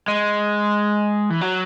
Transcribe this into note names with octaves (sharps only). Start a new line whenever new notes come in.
G#3
E3
F#3